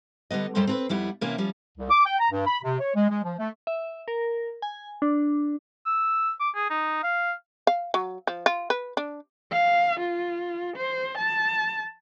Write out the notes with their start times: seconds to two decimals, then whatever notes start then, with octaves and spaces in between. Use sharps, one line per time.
0.30 D3 G3 B3 D#5
0.55 F#2 G3 C#4 A4 C5 D#5
0.67 C4 A4 B4
0.89 F2 G3 B3 E4
1.21 C3 E3 A#3 C#4 E4
1.38 F3 G3 C#4
1.78 C2
1.90 D6
2.05 G5
2.19 A#5
2.31 G2
2.46 B5
2.63 C3
2.80 C#5
2.95 G#3
3.09 G#3
3.24 F3
3.39 A3
3.67 E5
4.08 A#4
4.62 G#5
5.02 D4
5.86 E6
6.40 D6
6.55 G#4
6.70 D#4
7.03 F5
7.67 F5
7.94 F#3
8.27 F3
8.46 F4
8.70 B4
8.97 D4
9.52 F5
10.00 F4
10.77 C5
11.18 A5